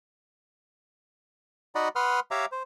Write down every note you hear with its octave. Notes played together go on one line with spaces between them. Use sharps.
D#4 F#4 D5 D#5 F#5 B5
B4 F#5 B5 C6 D#6 F6
G4 C#5 E5 F5 A#5 D6
C5